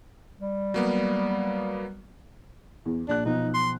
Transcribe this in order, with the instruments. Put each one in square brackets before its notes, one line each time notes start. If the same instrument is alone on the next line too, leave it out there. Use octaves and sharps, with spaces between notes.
[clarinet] G3
[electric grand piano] F#3 A#3 B3
[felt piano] E2
[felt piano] A#1 F#6 [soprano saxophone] D4
[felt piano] B1 F3 [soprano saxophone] D#4
[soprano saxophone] C6